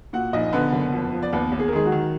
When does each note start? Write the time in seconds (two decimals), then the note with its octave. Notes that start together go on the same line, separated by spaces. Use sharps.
0.13 A#2 F#4 F#5
0.33 A#1 D#4 D#5
0.53 D3 B3 B4
0.72 F#1
0.93 F2
1.13 F3
1.22 D5
1.32 D#2 B3 B4
1.52 D#2
1.59 G#4
1.68 A#4
1.73 D#3 G#3 G#4
1.85 F#3 F#4
1.92 D#3